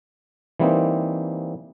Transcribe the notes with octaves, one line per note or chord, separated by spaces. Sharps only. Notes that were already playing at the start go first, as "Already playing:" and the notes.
E3 G3 A#3 C4 D#4